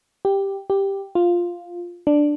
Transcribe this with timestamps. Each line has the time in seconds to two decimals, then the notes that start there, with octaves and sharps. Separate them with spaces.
0.25 G4
0.70 G4
1.15 F4
2.07 D4